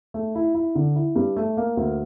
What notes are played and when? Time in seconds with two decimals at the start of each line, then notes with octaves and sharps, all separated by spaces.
0.14 A3
0.35 E4
0.55 E4
0.75 D3
0.96 E4
1.16 G2
1.37 A3
1.57 A#3
1.77 D2